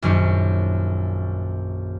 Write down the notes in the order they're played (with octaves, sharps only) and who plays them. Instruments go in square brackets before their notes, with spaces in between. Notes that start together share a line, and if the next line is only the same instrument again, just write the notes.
[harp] A#1 F#2 D#3 C#4 C#7